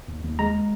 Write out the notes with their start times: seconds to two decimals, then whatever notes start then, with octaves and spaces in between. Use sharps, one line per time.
0.08 D#2
0.24 D#2
0.39 G#3 A#5